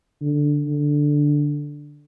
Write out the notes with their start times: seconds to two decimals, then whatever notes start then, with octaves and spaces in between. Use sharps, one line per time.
0.21 D3
0.66 D3